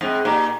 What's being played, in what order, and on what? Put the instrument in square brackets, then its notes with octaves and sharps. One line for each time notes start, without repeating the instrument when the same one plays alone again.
[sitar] G#2 [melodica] C4
[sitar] A#2 [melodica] D#4 G4